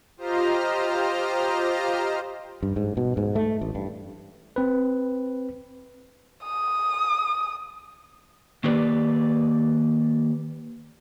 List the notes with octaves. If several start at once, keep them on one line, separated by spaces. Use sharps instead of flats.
F4 G4 C5 D#5 A#5 F6
G2
G#2
B2
G#2
A3
A1
G2
C4 B4
D#6
D#3 A#3 G4 B4 D5